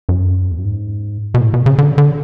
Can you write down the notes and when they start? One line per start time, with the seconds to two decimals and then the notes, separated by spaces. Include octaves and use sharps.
0.09 F#2
0.51 E2
0.59 F#2
0.65 G#2
1.34 B2
1.41 A2
1.54 B2
1.66 C#3
1.78 D3
1.98 D3